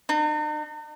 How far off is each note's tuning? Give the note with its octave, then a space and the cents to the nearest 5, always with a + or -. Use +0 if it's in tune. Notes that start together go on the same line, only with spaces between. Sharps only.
D#4 -45